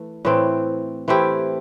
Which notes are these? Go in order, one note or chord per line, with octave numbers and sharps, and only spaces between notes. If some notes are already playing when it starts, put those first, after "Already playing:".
Already playing: E3 A3
A2 E3 C4
E3 A3 C4 E4 G4